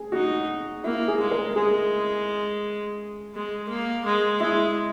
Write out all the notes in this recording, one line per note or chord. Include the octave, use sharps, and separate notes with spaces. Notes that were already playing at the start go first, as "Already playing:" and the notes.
Already playing: G#4
D#4 F#4
A#3 E4
G#4
G#3
A#4
G#3 G#4
G#3
A#3
G#3
G#3 E4